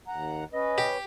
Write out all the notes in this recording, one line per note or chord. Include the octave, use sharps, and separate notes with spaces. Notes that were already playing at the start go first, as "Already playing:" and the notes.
D#2 F#5 A#5
C#4 B4 D#5
G4